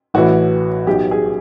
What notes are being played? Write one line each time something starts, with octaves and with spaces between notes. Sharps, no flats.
A1 A2 E3 F#4
B1 B2 G4
G#4